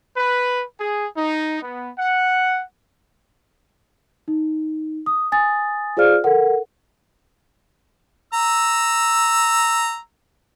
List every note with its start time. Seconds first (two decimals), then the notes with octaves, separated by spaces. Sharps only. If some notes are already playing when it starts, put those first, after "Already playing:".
0.16 B4
0.78 G#4
1.16 D#4
1.62 B3
1.98 F#5
4.28 D#4
5.06 D#6
5.32 G#5 D#6 A6
5.97 F4 G#4 C5 D5 F5 F6
6.24 A4 A#4 F#5
8.33 A#5 E6